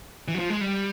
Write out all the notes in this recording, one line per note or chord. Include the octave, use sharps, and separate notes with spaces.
E3
F#3
F3
G#3
G3